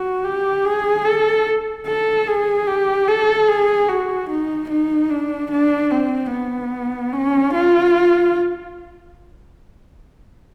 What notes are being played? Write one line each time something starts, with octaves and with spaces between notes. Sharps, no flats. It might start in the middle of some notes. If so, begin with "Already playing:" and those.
Already playing: F#4
G4
G#4
A4
A4
G#4
G4
A4
G#4
F#4
D#4
D#4
D4
D4
C4
B3
C#4
F4